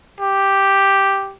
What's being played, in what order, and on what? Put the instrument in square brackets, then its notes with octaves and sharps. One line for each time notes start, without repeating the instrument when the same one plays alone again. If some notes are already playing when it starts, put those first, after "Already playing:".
[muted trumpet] G4